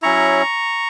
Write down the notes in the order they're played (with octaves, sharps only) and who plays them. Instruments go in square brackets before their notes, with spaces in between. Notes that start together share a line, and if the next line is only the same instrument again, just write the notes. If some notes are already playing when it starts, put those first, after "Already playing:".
[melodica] F#3 C#4 E4 A#5 C#6